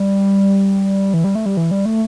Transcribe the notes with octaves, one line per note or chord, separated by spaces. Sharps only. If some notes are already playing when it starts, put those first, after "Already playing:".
Already playing: G3
E3
G3
A3
G3
E3
G3
A3